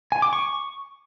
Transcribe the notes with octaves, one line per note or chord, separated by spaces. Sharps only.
G#5
D6
C#6